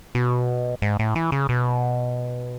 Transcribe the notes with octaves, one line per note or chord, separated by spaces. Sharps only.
B2
G#2
A2
E3
C#3
B2